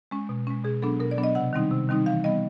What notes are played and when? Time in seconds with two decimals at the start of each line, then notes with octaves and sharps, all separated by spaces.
0.11 G#3 C#4
0.29 B2
0.47 G#3 C#4
0.64 B2 G#4
0.82 F#3 B3 D4 A4
1.00 B2 A#4
1.11 D5
1.17 F#3 B3 D4
1.24 D#5
1.35 C3 F#5
1.53 D#3 G3 C4 D#4
1.71 C3
1.88 D#3 G3 C4 D#4
2.06 E3 F5
2.24 G3 B3 D#5